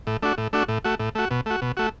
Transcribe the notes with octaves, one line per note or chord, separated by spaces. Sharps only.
A2
A3 D4 F#4
A2
A3 D4 F#4
A2
A3 F#4
A2
A3 F#4
B2
A3 F#4
B2
A3 F#4